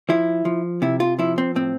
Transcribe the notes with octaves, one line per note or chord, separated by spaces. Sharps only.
F3 E4
F3
C3 E4
F4
F3 E4
C4
A2 C4